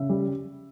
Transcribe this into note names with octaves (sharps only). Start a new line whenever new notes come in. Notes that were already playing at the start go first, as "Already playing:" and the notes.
Already playing: C#3 E5
G3